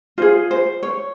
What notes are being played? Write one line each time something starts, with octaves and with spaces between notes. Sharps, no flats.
F4 G#4 C5
C5
C#5